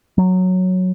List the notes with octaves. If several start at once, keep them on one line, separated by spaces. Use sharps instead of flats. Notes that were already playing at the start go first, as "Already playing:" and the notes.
F#3